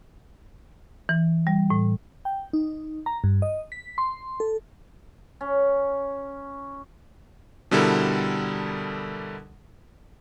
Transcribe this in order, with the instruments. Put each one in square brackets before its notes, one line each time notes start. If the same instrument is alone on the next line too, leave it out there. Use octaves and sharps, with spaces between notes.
[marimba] E3
G3
A2
[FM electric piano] G5
D#4
A#5
G2
D#5
B6
C6
A4
[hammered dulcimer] C#4
[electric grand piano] B2 D3 G3 E4 A4 A#4